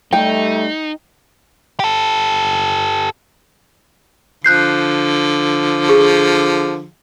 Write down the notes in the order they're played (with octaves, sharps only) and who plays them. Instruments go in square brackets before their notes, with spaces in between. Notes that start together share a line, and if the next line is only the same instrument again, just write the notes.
[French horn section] G3 A3 [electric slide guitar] D#4 [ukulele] G5
[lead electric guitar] G4 A4
[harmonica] D3 F3 [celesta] F#6 G6 C7
[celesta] G#4